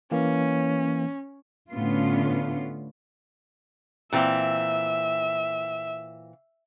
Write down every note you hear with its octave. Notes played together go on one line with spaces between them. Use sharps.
E3 A#3 C#4
A2 D3 B3 C#4 F4
A#2 E3 C4 E5